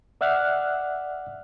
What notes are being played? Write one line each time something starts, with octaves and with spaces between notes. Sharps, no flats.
D5 E5 F#5 F6 F#6